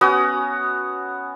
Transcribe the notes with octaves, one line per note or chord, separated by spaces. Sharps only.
B3 C#4 F#4 D#6